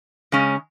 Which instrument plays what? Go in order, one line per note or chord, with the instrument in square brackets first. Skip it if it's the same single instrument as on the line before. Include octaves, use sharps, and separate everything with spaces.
[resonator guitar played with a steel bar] C#3 G#3 C#4